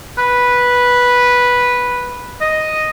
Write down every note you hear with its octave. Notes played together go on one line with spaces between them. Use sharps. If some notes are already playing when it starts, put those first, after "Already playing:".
B4
D#5